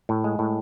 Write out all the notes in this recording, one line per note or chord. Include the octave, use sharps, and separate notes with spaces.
A2
G#3
A2